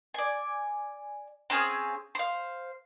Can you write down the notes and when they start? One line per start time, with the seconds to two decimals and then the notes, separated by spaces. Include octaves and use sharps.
0.14 D5 G#5
1.50 C4 C#4 G#4 F5
2.15 C5 F5